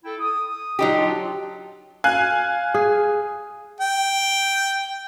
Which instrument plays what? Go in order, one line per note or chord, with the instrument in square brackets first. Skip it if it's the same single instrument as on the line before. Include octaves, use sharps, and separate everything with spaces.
[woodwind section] E4 A4 G5
D#6
[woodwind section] A#2 [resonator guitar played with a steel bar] F#3 D#4 G4
[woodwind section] D4 F4
[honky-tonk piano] F5 G#5 F#6
[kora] G#4
[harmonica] G5